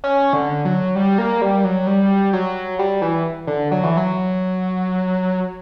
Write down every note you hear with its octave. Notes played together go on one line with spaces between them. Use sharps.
C#4
D3
F#3
G3
A#3
G3
F#3
G3
F#3
G3
E3
D3
F#3
E3
F#3